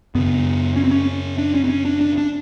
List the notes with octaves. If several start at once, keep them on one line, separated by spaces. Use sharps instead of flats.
F#2 C#3 B3
C#4
C4
C#4
D4
C#4
C4
C#4
D4
D4
D4